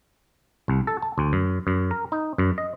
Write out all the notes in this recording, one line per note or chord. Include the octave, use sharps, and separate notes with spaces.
C2
A4
A5
D2
F#2
F#2
A#4
D#4
F#2
D#5